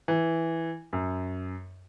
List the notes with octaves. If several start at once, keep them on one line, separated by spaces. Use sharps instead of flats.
E3
F#2